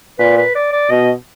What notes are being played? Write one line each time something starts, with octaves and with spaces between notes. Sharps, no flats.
A#2 B4
B4
D5
D5
B2 D#5